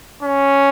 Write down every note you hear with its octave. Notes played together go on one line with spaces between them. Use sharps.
C#4